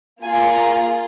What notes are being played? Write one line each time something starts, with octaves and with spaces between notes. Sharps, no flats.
A#3 F4 G#4 G#5
A#5